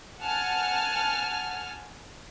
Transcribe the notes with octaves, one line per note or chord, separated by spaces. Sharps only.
F#5 G#5 A5 F6